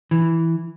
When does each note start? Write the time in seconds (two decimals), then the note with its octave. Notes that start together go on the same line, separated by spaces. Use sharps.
0.11 E3